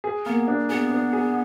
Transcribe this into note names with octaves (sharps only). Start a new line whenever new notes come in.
G#4
A#3 B3
D4
B3 G#4
D4
G#4